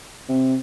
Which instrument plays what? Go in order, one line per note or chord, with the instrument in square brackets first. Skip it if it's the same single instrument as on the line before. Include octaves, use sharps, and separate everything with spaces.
[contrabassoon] C3